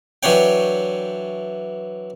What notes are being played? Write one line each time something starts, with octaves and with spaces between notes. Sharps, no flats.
E3 F#3 D4 C#5 G5